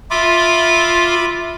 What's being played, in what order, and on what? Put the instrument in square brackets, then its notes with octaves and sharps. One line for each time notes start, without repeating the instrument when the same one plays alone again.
[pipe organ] F4 [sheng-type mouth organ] E5 B5 D6